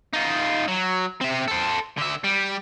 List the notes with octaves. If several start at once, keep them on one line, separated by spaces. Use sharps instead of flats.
D#4 F4
F#3
C4 E5
A4 C5
D3 E5
G3